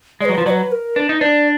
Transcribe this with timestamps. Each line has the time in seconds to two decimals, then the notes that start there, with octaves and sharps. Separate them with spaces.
0.21 G#3 D5
0.25 F#3 B4
0.38 F3
0.46 F#3 D5
0.50 B4
0.72 A#4
0.96 D4 B4
1.09 D#4
1.21 D4 D5